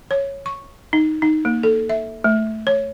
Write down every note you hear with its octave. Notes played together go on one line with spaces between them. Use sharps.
C#5
C#6
D#4
D#4
A#3
A4
E5
A3
C#5